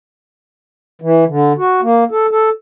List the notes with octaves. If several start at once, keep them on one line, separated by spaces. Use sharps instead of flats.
E3
D3
F#4
A#3
A4
A4